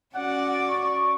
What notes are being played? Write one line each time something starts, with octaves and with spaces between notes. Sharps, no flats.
C#4 F#4 D5 F#5
C#6